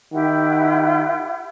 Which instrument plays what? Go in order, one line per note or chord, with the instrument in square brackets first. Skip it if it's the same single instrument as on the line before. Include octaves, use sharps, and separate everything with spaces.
[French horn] D#3 [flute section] E4 G4 F#5